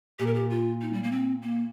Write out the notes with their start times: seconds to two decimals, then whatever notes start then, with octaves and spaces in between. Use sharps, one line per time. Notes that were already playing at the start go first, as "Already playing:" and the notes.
0.19 A#2 G4
0.27 A#4
0.34 G4
0.50 F4
0.81 D#4
0.93 G3
1.03 A#3
1.12 C4
1.42 A#3